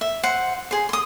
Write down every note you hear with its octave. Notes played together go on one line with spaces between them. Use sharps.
E5
C5 F#5
G#4 C5
C6 D#6